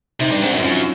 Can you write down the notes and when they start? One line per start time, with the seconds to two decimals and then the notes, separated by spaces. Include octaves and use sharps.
0.20 C3 D#4
0.30 G2 D4
0.42 G#2 C4
0.52 F#2 C#4
0.62 F#2 F4